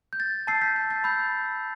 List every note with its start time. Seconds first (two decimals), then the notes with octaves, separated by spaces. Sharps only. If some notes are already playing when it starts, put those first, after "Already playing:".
0.13 G6
0.20 A6
0.47 A5 E6 G6 A6 C7
0.62 G6 B6
0.76 G6
0.90 A6
1.04 B5 E6 G6